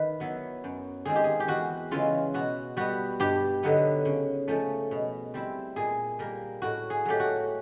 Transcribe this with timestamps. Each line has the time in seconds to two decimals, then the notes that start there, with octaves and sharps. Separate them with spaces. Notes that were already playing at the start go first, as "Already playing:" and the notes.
Already playing: D#3 B4
0.20 F#3 B3 E4
0.64 F#2
1.05 D#3 G#3 C4 F4 G#4
1.16 G4
1.24 G#4
1.40 G4
1.48 E2 F#4
1.91 C#3 E3 G#3 F4
2.34 B2 F#4
2.77 G3 B3 F#4
3.20 G2 G4
3.63 D3 F#3 B3 D#4
4.05 C#3
4.48 F3 A3 C#4
4.91 B2
5.34 G3 C4 E4
5.76 A#2 G#4
6.19 G3 A#3 A#4
6.62 A2 F#4
6.90 G#4
7.05 F#3 A3 G4
7.20 F#4